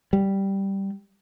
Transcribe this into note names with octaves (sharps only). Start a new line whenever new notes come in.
G3